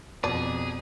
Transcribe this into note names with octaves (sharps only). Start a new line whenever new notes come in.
F2 B2 G#4 D5 A5